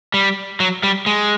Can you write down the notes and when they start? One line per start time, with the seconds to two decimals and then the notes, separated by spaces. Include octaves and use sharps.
0.14 G3
0.60 F#3
0.83 G3
1.06 G#3